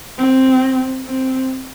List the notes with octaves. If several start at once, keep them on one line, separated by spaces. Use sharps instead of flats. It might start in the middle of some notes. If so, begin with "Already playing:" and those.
C4
C4